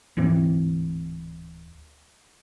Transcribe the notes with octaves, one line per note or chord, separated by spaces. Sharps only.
D1 G#2 E3 C4